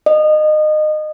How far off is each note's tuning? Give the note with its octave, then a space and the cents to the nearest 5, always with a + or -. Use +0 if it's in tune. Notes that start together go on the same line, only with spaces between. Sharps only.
D#5 -25